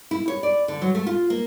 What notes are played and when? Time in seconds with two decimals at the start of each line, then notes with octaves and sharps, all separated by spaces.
0.11 E4
0.28 C#5
0.43 D5
0.68 D3
0.82 F#3
0.95 A3
1.07 F4
1.30 A#3